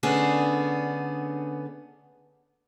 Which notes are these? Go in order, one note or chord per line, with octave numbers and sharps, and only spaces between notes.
D3 A3 B3 C#4 D4 G#4